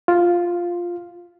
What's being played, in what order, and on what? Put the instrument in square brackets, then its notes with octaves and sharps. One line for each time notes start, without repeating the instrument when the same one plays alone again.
[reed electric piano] F4